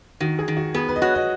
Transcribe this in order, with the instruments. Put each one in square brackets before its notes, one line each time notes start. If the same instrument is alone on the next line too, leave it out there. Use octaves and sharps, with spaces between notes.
[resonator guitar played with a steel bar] D#3 [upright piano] F#4
[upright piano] G#4
[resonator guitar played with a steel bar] D#3
[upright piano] F#4
[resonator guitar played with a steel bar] B3 [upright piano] G#4
[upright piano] B4
D#5
[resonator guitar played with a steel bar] F#4 [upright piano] C#5
[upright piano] D#5